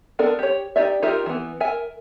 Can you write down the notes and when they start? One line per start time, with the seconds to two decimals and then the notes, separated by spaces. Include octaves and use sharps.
0.19 B3 D4 A4 A#4 D5
0.39 G4 C#5
0.76 D#4 G4 D5 E5
1.02 D#4 F4 G4 A#4 E5
1.26 E3 B3
1.60 A#4 E5 G#5